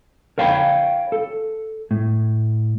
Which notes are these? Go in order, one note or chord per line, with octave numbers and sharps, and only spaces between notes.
A#4 C#5 F5 G5 A#5 B5
A4
A2